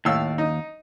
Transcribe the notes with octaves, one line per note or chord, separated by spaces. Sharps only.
D#2 A2 F5 E6
D#4